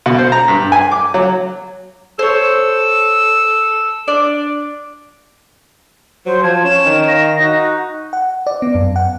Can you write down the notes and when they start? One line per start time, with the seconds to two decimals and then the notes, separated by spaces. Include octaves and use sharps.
0.06 B2
0.18 C5
0.32 A#5
0.48 G2
0.72 G#5
0.92 D6
1.14 F#3
2.19 A4 C5 C#5 E6
4.08 D4 D5
6.26 F#3 C5
6.43 F3 A5 G#6
6.64 C#4 C#5 E7
6.85 D#3
7.08 F5 A#6
7.40 D#4 F#4
8.13 F#5
8.47 D5
8.62 B3
8.75 F#2
8.96 F#5